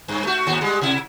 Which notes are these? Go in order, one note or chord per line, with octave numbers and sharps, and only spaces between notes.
G2
A3 F#4
D#2 A2 F#4
G3 G#3
C3 E4